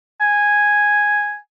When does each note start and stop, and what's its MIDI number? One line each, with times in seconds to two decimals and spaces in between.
0.21 1.37 80